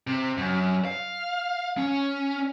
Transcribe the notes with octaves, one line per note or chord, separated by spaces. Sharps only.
C3
F#2
F5
C#4